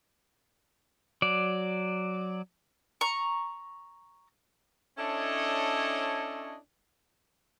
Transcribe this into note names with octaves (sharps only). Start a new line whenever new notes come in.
F#3 D5
A#5 C#6
C#4 D4 E4 A4 C#5 D#5